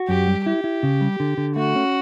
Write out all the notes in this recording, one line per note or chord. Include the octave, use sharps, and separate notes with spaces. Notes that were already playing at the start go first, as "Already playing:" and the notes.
Already playing: F#4
F#2 G4
G3
E4 G4
E4
C#3
G3
D3
D3
A3 F#4
C#4